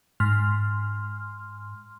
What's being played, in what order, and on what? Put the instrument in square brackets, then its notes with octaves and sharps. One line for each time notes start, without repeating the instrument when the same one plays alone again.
[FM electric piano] G#2 C6 F6